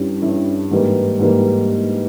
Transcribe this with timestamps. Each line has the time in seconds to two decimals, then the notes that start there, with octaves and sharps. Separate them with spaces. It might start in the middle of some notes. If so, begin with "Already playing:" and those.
Already playing: G2 G3 C#4 E4
0.22 G2 G3 C#4 E4
0.71 G#2 E3 G3 A#3
1.19 G#2 E3 G3 A#3